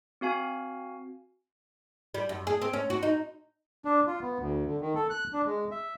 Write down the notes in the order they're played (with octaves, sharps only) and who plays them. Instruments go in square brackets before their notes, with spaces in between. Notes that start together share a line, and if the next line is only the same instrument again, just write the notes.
[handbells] C4 F#4 F5 G#5
[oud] G3
F#2
G#4
C4
C#4
F#4
D#4
[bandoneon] D4
F4
B3
D2
D3
D#3
A4
F#6
D4
G#3
E5